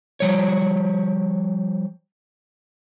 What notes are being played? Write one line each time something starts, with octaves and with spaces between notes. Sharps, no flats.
F3 G3 C#5